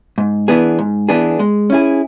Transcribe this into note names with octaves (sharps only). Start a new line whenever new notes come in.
G#2
E3 B3 D4 G#4
G#2
E3 B3 D4 G#4
G#3
C#4 E4 G#4